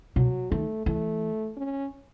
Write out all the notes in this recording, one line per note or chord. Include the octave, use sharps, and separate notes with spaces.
B2 F#3
D#3 A3
E3 A3
C#4